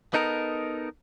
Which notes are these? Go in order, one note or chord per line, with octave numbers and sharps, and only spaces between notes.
B3 D#4 A4 A#4